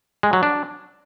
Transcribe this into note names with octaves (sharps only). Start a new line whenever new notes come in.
G#3
F#3
D4